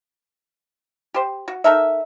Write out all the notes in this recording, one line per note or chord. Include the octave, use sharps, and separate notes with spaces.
G4 C5
F#4
D#4 A4 A#4 E5